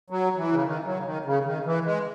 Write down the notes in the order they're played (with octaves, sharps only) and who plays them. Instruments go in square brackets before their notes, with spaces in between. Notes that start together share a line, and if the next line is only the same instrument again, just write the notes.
[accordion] F#3
E3
C#3
D#3
F#3
C#3
D#3
C#3
D#3
E3
G#3